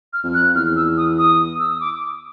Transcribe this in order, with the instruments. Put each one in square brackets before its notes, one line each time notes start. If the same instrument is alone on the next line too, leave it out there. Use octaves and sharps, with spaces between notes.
[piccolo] F6
[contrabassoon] F2
[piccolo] F#6
[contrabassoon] E2 [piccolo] F6
[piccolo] E6
D#6
D#6
E6
D#6
D6